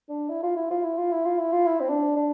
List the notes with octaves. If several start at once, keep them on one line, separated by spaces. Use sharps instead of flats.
D4
E4
F4
E4
F4
E4
F4
E4
F4
E4
F4
E4
C4
D4
D4